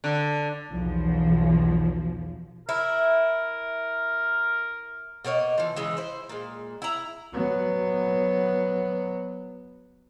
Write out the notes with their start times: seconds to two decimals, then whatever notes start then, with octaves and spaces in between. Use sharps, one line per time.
0.04 D3
0.72 B1 E2 F3
2.69 E4 A#4
5.24 B2 A#3 C#5 D#5
5.58 E3 F3
5.76 C#3 E3 G#3
5.97 E4 C5
6.29 A#2 G#3
6.82 E4 A#5
7.33 F#3 B3